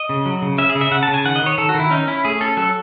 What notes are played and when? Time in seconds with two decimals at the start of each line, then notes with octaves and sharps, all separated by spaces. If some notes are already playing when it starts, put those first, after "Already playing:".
Already playing: D#5
0.09 C#3
0.26 F#3
0.42 C#3
0.58 C#4 E5
0.69 G#4
0.75 C#3
0.81 E5
0.91 C#3 F#5
1.03 A5
1.08 C#3
1.14 G#5
1.24 D#3 F#5
1.36 D#5
1.41 D#3 C#5
1.58 D#3 A4
1.69 F#4
1.75 D#3
1.80 E4
1.91 C#4 D#4
2.08 C#4 E4
2.25 A3 G#4
2.41 C#4 A4
2.57 F#3 A4